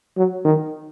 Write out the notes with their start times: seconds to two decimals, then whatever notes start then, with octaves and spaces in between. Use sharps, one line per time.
0.17 F#3
0.45 D#3